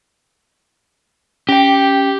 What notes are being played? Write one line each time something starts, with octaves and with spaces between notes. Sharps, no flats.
C#4 G4 G5